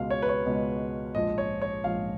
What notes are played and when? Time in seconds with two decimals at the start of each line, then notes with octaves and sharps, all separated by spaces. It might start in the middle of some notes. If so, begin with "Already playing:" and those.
Already playing: C#2 B2 G#3 F5
0.10 C#5
0.22 B4
0.29 C#5
0.46 C#2 B2 G#3
1.15 A#1 G#2 F3 D#5
1.38 C#5
1.62 C#5
1.84 A#1 G#2 F3 F5